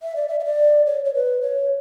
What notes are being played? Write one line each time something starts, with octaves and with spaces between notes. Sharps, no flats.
E5
D5
E5
E5
D5
C#5
C#5
B4
C#5